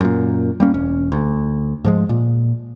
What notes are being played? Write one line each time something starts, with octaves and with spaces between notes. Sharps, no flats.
F#2 A#2
G3 A#3 C#4
E1 C#4
D2
G#2 F3 G#3
A#2